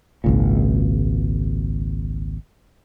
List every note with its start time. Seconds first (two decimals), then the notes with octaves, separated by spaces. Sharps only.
0.24 G#1 C#2 A#2